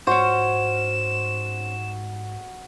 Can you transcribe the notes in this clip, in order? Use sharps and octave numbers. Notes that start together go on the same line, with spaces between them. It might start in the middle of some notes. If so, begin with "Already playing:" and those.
G#2 C#4 F#4 C5 E7